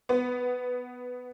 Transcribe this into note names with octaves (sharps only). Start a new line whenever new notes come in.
B3